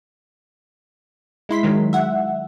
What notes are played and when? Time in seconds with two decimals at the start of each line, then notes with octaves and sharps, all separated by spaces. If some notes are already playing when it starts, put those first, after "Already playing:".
1.49 G#3 E4 C6 B6
1.63 D#3 F#3 G#3
1.93 E5 F#5